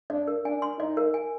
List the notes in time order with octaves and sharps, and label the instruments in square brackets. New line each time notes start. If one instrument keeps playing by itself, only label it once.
[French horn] D4 [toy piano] D5
[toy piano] A#4
[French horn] D4 [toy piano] G#5
[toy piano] C6
[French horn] D#4 [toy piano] D5
[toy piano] A#4
G#5